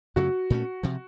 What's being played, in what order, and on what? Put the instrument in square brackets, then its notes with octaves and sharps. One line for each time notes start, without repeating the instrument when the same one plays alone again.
[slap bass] F#2 C#3 F#3 A3 [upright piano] F#4
[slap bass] A#2 A3 C#4
C3 F3